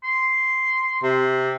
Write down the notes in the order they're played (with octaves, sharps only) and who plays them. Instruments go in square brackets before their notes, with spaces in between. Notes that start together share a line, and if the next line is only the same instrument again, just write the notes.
[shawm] C6
[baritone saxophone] C3